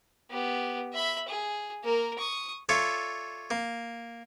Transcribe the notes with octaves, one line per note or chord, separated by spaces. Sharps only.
B3 G4
E5 B5
G#4
A#3 A#4
C#6 D#6
F4 A4 C#5 D5 E5
A#3